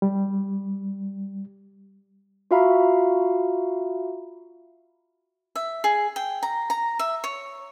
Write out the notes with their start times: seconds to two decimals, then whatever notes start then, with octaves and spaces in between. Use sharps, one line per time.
0.02 G3
2.51 F4 F#4 E5 F5 A#5 B5
5.56 E5
5.84 G#4
6.16 G5
6.43 A#5
6.70 A#5
6.99 E5
7.24 C#5